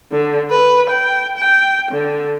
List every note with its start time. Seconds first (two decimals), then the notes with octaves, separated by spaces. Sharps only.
0.12 D3
0.50 B4
0.90 G5
1.38 G5
1.91 D3